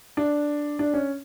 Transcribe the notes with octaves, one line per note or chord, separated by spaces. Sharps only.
D4
D4
C#4